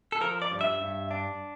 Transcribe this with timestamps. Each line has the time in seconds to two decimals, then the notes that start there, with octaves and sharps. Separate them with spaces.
0.12 A4
0.21 F3 A#4
0.42 D5
0.51 G2
0.61 E5
0.81 G2
1.11 D4